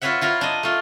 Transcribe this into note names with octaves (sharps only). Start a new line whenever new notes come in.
F4 F#4 B4 C#5 E5 F#5
E4 F4 A#4
D4 D#5
A3 F4